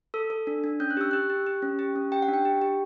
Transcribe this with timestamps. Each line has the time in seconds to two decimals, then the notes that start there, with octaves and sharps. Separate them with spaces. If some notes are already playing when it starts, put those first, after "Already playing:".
0.14 A4 E6
0.30 A4
0.47 D4
0.64 D4
0.80 C#4 G6
0.91 F#6
0.97 G4 E6
1.11 G4 F#6
1.30 G4
1.46 G4
1.62 C#4
1.79 G4
1.96 C#4
2.12 G4 G5
2.22 F#5
2.28 D4
2.34 G5
2.45 G4
2.61 G4